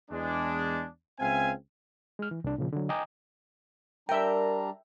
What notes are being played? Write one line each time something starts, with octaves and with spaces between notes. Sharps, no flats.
E2 G#3 D4
C#2 C4 E5 F5 G#5
G#3 F6
E3
C2 D4
A#2 C#3 F3
D3 F#3
D#5 G5 G#5 A#5 D6 D#6
G3 D4 A#4 E5 G5 A#5